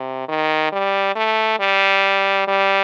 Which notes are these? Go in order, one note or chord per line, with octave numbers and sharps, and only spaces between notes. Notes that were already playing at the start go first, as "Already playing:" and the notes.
Already playing: C3
D#3
G3
A3
G3
G3